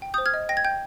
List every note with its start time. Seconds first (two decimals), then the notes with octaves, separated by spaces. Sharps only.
0.02 G5
0.14 D#6 G6
0.18 C5
0.26 F6 G#6
0.34 D#5
0.49 G5 A#6
0.57 G#6
0.65 G5 G6